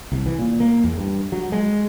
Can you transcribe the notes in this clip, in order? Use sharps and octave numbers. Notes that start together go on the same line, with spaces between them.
C2
E3
A#2
A#3
E2
G2
F#3
G#3